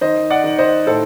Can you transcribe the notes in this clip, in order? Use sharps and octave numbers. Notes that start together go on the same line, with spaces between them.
D#3 C5 D#5
D5 F#5
D#3
C5 D#5
A2 A4 C5